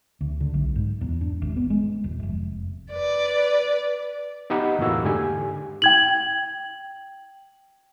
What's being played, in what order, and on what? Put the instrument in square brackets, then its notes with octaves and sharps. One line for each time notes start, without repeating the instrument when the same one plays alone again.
[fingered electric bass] D2
D3
B1
G#2
E2
D4
G#1
B3
G#3
D#1
F1
[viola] B4 D5
[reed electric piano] B3 D#4 G4 D#5 F#5 B5
E2 A2 A#3 E4 F#4 E6
G#2 D3 G4 G#5
[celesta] G5 G#6 F#7